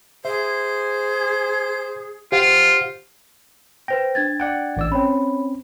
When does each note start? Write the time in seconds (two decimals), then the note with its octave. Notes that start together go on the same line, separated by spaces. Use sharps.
0.25 G#4 C5 E5
2.32 F4 G4 C5 F5 F#5
3.88 B4 C5 G5 A#6
4.15 D4 G#6 A6
4.40 D5 F#5 G5
4.77 A1 D5 E6
4.92 C4 C#4 C#5 B5